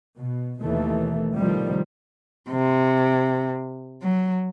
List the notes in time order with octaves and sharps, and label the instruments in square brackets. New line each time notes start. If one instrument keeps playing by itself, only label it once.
[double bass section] B2
D#2 B2 E3 A3
F2 A2 C3 D#3 F3 G3
[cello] C3
F#3